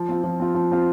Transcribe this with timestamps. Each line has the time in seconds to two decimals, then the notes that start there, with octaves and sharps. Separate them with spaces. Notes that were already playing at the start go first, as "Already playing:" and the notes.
Already playing: F3
0.09 C4 F4
0.24 F3
0.40 C4 F4
0.55 F3
0.71 C4 F4